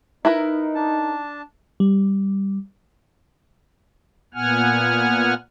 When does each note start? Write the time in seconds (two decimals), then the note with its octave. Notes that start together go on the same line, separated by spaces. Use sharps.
0.25 D#4 E4 A#4 B4
0.75 D4 A5
1.80 G3
4.34 A#2 B3 F#5 G#5 F6